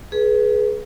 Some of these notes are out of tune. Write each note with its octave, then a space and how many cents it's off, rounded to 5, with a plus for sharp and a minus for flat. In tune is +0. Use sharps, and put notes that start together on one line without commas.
G#4 +20 B4 -15